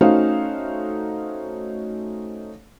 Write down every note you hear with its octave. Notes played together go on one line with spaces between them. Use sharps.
A3 C#4 D#4 F#4 C5 F5